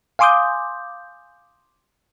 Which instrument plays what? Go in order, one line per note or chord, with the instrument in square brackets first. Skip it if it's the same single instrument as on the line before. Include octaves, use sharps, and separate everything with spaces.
[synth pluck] F5 G#5 C6 D6 D#6 G6